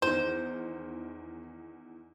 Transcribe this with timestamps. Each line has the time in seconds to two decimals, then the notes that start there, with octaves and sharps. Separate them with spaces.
0.02 E2 D#3 C5